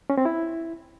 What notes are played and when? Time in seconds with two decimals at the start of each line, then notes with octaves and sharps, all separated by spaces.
0.10 C#4
0.17 C4
0.25 E4